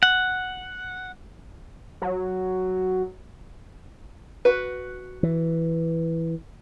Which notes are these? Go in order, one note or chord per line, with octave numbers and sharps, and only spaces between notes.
F#5
F#3
F#4 B4
E3